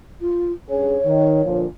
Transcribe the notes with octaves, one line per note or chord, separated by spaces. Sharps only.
F4
G2 C#4 G#4 C#5
D#3
A#2 D3 F3